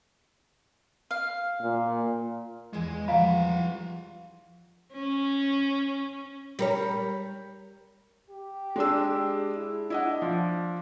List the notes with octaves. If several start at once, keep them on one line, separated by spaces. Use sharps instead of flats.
F5
A#2
E2 E3 G#3
F3 G3 F4 F5 F#5 A#5 B5
C#4
G3 A#4 C#5
G4
G#3 D4 E6
E4
D4 E4 D#5 F#5
F3